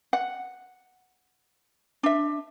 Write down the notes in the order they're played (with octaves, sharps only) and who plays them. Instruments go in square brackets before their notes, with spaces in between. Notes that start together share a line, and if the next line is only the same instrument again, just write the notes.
[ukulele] F#5
D4 E5